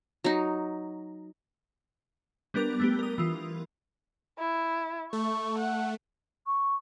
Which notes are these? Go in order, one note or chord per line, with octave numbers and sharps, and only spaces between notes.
F#3 D#4
G3 B3 D4 A#4 D6
A3 B3 G4
A#4 D#6
E3 F4
E4
A3 C#6
F#5
C#6